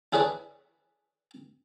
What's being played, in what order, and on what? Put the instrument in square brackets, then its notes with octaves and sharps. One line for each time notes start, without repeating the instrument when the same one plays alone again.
[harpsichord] D4 E4 G#4 B4 C#5 D5